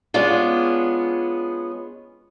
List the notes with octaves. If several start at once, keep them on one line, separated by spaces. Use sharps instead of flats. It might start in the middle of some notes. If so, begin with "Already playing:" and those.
G#3 B3 C#4 D4 F4